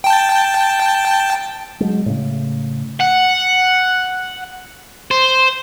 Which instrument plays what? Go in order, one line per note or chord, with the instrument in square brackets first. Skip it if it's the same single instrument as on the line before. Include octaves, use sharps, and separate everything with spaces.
[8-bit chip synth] G5 A5
[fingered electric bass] F#3 G#3
A2 C#3
[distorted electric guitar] F#5
C5